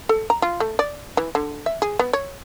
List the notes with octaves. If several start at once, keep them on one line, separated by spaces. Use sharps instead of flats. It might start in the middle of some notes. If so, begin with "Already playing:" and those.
A4
A#5
F4
A3
D5
E3
D3
E5
G#4
B3
C#5